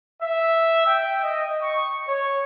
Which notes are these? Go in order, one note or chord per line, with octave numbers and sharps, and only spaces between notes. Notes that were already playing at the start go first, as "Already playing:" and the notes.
E5
G5
D#5
C#6
C#5